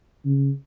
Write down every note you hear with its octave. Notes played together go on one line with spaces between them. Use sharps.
C#3